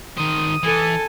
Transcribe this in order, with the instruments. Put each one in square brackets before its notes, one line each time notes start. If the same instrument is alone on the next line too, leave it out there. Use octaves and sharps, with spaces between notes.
[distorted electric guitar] D#3 C5 [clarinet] D#6
[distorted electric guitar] E3 [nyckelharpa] A4 A5 [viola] G#5